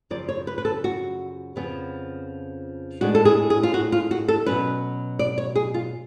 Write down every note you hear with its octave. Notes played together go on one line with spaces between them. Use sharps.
F#2 C#3 F3 D5
C#5
B4
B4
A4
F#4
F2 C#3 F3 B3
A2 G#3 B3 D4 F#4
A4
G#4
G#4
F4
F#4
F4
F#4
A4
B2 F#3 C#4 B4
D5
C#5
G#4
F4